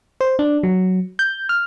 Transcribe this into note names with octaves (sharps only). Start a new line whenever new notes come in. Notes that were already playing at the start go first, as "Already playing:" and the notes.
C5
D4
F#3
G6
F6